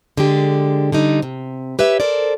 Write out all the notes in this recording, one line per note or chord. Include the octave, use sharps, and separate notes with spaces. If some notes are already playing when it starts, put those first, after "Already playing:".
D3 G#3 G4
D3 G3 D#4
C3
G4 B4 C#5 E5
A4 A#4 C5 D5